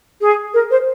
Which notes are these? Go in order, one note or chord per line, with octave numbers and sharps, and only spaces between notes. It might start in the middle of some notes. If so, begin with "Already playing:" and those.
G#4
A#4
C5